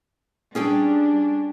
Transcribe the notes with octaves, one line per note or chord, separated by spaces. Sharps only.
G3 C#4 D4 G#4 G5